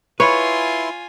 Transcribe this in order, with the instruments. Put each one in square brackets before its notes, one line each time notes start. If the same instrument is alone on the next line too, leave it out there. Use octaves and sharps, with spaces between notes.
[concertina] E4 C6 [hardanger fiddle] F4 G#5 [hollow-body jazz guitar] B4 [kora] C#5